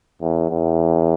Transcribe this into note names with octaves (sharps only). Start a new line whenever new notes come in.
E2
E2